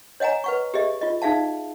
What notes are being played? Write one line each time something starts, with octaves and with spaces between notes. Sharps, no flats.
C#5 D#5 F#5 G#5 A#5
B4 F#5 C#6
G4 G#4 D#5 E5
F4 D#5
D#4 G#4 E5 F5 A5